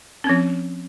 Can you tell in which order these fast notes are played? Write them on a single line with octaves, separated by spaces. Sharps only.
C#4 C4 F3